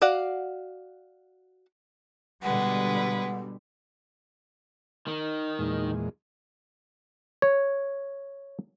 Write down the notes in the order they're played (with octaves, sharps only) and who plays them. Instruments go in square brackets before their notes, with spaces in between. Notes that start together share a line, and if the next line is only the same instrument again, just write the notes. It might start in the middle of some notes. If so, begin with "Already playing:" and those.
[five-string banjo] F#4 D5 F5 F#5
[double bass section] B2 D3 G3 [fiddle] G#3 B4 [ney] F#5
[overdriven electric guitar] D#3
[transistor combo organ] E2 A#2 G#3
[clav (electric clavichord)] C#5